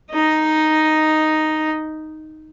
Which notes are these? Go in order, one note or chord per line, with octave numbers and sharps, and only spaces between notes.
D#4 D#5